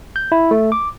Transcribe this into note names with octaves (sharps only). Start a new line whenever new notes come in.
G6
E4
A3
D6